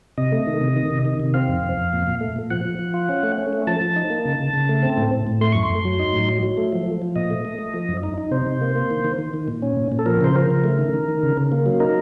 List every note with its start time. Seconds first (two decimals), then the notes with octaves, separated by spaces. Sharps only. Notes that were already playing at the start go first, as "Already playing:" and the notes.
0.17 C3 D#5
0.32 A3
0.47 D#3
0.61 C3
0.76 D#3
0.90 C3
1.05 D#3
1.20 C3
1.34 C4 F5
1.48 F2
1.64 F2
1.78 F2
1.93 A#2
2.07 A#2
2.21 A3
2.36 A#2
2.50 F3 F#5
2.65 F3
2.79 F3
2.94 F4
3.09 C#4
3.23 A3
3.38 C#4
3.53 A3
3.67 F3 A5
3.81 F3
3.96 D#4
4.10 A#3
4.25 C#3
4.40 C#3
4.53 C#3
4.69 A3
4.83 C4
4.97 A2
5.12 A2
5.27 A2
5.41 A3 C6
5.52 F#2 C#6
5.63 C6
5.70 F#2
5.85 F#3
5.99 D#4
6.13 A2
6.28 F#3
6.43 F#3
6.57 A3
6.72 F3
6.86 F3
7.02 F3
7.16 A#2 D#5
7.30 A3
7.45 A3
7.59 A3
7.74 F3
7.89 F#2
8.03 D#4
8.18 D#4
8.31 C3 C5
8.46 C3
8.61 A#3
8.76 A#3
8.91 D#3
9.04 D#3
9.18 D#3
9.34 D#3
9.48 A#2
9.62 C#4
9.77 A#2
9.92 A#2
9.99 A4
10.06 F3 A#4
10.21 C#3 C5
10.35 F3 A#4
10.50 C#3
10.64 A3
10.79 D#3
10.94 D#3
11.08 D#3
11.23 C#3
11.37 C#3
11.52 A#3
11.66 F#3
11.80 D#4 A#4